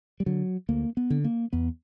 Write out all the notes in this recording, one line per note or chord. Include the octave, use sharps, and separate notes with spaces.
G3
D3 F#3
D2 A#3
B3
D3
A#3
E2 B3